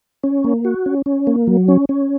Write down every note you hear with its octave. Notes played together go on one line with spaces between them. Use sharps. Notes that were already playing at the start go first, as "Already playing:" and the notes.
C#4
A#3
F#4
C#4
C#4
A#3
F#3
C#4
C#4